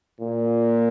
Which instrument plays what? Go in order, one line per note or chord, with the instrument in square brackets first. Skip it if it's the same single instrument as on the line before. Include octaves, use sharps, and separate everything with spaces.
[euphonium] A#2